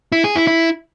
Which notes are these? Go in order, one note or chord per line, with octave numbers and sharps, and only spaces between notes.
E4
G#4
E4
E4